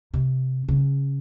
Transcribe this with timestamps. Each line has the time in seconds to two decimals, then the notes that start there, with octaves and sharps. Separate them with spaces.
0.14 C3
0.68 C#3